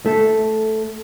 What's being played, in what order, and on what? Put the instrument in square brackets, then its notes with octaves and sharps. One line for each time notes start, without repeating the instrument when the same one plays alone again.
[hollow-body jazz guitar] A3